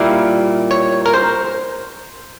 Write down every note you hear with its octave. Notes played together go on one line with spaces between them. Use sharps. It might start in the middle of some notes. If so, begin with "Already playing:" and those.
Already playing: A#2 G3 A#3 E4 F5
C#5
A#4
C5